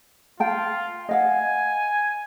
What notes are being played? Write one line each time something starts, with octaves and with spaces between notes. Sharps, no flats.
F4 F5 G5 A5
D#5 F5 F#5 G#5